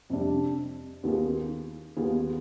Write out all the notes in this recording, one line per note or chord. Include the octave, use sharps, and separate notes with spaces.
F2 C3 G3 D4
D#2 D#3 B3 F4 G#4
D#2 D#3 B3 F4 G#4